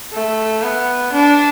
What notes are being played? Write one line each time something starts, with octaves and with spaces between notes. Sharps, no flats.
A3
B3
D4